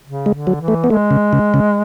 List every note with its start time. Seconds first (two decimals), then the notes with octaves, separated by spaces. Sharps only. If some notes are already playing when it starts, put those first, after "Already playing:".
0.06 C#3
0.26 G#3
0.33 D3
0.47 F#3
0.61 E3
0.68 A3
0.84 B3
0.89 G#3 A3
1.11 C#3
1.33 C#3
1.54 C#3